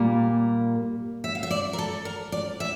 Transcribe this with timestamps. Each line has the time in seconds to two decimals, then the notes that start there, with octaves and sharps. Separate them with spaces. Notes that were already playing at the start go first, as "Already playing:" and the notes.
Already playing: A#2 G3 A#3
1.24 E5
1.35 F5
1.43 E5
1.51 D5
1.73 A#4
1.78 A4
2.05 A#4
2.32 D5
2.60 E5